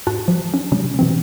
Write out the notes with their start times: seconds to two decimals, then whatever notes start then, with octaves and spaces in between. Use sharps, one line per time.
0.07 G#2 F4 F#4 A5 F#6
0.28 F3
0.54 C#4
0.72 C3 F#3 G#3 C#4
0.99 B2 E3 C4